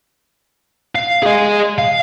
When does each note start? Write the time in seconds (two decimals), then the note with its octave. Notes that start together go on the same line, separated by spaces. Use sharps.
0.95 F5
1.23 G#4 D#5
1.78 F5